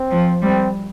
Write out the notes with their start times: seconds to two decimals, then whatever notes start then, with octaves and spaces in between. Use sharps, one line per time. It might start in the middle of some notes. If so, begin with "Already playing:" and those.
Already playing: C4
0.11 F3
0.42 G3 C4